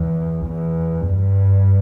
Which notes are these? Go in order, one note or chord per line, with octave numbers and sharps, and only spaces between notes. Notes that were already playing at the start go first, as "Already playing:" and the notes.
Already playing: E2
E2
G2